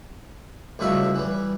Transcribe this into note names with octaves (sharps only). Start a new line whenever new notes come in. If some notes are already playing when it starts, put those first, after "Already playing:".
C#2 A2 F#3 G3 E5 F5
E3 G3